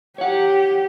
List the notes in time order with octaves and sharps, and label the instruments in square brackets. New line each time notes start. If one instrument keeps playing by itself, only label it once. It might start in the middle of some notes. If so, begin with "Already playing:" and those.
[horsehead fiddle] G4 [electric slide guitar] C#5 F#5